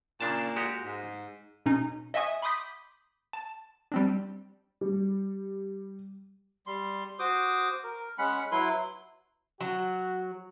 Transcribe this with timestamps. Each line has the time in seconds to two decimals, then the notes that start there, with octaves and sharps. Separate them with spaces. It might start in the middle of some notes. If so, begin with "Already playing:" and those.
0.21 A#2 C#3 D4 A5
0.56 G#3 F#4 G4
0.82 G#2
1.66 B2 C#4 D#4
2.14 D#5 E5 F#5 G#5 C#6 D#6
2.42 B5 C6 D6 D#6 G6 B6
3.33 A5
3.92 G3 C4 D4
4.81 G3
6.66 G3 C6
7.19 F#4 C5 D6 D#6
7.84 A#4
8.18 G#3 C#4 F#5 B5
8.52 F#3 E4 B4 C6
9.61 F#3 F#4